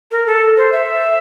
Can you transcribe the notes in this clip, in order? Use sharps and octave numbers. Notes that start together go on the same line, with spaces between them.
A#4
A4
C5
E5